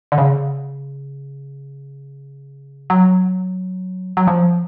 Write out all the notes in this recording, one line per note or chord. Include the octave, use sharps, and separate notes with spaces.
D3
C#3
F#3
F#3
F3